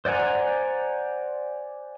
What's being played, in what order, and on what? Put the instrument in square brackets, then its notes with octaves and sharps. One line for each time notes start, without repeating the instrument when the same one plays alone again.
[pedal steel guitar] C5 D5 F#5 G#5 A#5